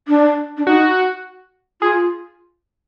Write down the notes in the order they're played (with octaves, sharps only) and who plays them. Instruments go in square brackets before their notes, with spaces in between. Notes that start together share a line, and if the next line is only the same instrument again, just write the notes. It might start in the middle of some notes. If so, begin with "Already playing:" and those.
[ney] D4
D4
[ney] D#4 [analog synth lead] F#4
[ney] F4 [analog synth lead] G#4